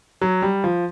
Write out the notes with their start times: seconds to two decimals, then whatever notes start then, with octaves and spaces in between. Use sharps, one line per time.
0.21 F#3
0.42 G3
0.64 F3